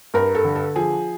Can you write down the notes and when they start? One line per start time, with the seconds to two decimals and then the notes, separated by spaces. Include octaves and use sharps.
0.14 G2 A#4
0.35 A4
0.45 D3
0.55 A4
0.76 F3 G#4